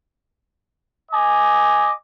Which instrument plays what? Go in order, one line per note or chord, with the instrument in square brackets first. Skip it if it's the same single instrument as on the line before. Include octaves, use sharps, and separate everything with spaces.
[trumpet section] D#5 G#5 D6